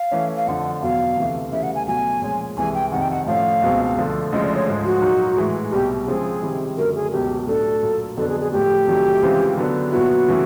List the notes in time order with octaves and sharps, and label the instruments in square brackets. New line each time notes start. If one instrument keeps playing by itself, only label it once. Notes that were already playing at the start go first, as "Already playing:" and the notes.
Already playing: [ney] F5
[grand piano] E3 A3 C#4
[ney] F5
[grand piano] F2 D3 F3 [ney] F#5
[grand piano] E2 B2 F#3 [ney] F5
[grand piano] D2 C3 E3 A3
[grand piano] D2 C#3 E3 G3 [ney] E5
[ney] F#5
G#5
[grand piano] B2 F#3 A3 [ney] G#5
[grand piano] A#2 F3 G#3 C#4
[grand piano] C2 C3 E3 G#3 [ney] G#5
[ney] G5
[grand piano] F2 C3 D#3 [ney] F#5
[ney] G5
F#5
[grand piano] A2 F3 A3 C#4 [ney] F5
[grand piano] C#2 B2 G#3 C4
D2 D3 F3 A3
[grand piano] D2 C#3 F3 G#3 [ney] D#5
[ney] D5
C#5
[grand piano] G#2 F3 G#3
[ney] F#4
[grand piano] A#2 F#3 A#3 D#4
A2 E3 G#3
[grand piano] C2 B2 G3 [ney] G4
[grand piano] C#3 F3 G#3 C4 [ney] G#4
[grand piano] C3 D#3 G3 C4 E4
[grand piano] F#2 D3 F#3 A3 [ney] A#4
[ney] G#4
[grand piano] C#2 B2 F#3 [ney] G4
[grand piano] A2 F#3 A3 D4 [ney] A4
[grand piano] A#2 F#3 A#3
[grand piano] F2 D3 F#3 B3 D4 [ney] A4
[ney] G#4
G#4
[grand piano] A2 F3 A3 [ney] G4
[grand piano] C2 C3 D#3 F#3 A3
C#3 E3 G#3 C4 F4
D3 F#3 B3 D4
[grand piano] A#2 F#3 B3 E4 [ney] F#4
[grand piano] C#3 E3 A3